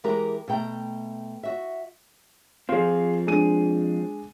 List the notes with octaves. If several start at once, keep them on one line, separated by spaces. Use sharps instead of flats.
E3 G#3 G4 A#4 A#5
B2 A3 G5 A#5
F#4 E5
F3 C4 F4 G#4
G#3 D4 D#7